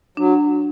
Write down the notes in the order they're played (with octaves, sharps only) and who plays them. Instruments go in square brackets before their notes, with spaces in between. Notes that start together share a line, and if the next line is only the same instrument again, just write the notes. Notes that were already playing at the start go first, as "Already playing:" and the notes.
[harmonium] F#3 [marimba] D4